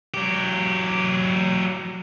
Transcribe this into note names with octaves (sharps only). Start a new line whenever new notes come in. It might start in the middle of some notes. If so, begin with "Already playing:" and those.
F#3 G4